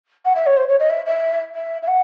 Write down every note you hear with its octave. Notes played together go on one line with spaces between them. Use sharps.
F#5
E5
C#5
C5
C#5
D#5
E5
E5
E5
E5
F#5